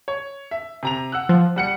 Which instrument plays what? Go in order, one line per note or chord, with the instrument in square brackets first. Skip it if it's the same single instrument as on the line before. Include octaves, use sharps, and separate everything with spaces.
[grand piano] C#5
E5
C3 A#5 F7
F#5 E6 F#6
[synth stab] F3
[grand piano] G3 F#5 C#7